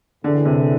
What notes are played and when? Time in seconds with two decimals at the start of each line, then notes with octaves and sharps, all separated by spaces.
0.24 A2 D3 E3 A3 D4 G#4
0.45 C3